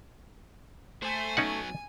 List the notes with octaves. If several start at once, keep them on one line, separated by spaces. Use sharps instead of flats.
A3 C5 G#5
F#3 B3 C#4 D#4 F#5